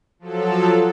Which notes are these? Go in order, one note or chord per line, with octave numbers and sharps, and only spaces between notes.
F3 F#3 A4